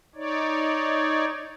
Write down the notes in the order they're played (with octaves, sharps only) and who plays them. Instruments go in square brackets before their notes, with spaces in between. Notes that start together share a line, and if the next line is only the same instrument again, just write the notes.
[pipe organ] D#4 C#5 D5